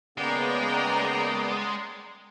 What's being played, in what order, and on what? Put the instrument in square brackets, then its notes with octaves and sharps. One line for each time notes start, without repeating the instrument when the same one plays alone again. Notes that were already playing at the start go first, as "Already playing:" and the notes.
[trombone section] C#3 A#3 [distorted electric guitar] G#3 [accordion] B3 D5 [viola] G5 A#5